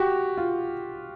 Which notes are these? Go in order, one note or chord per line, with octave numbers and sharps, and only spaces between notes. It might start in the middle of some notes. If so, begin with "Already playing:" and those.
Already playing: F#4 G4
F4